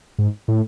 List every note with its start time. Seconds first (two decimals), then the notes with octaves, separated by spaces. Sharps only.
0.19 G#2
0.48 A2